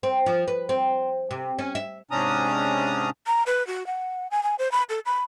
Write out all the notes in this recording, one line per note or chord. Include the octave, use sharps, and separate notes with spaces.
C4
F3
B4
C4
C3
C#4
E5
G#2 C3 C#4 D4 A#5 D#6
A#5
B4
F#4
F#5
G#5
G#5
C5
B5
A4
B5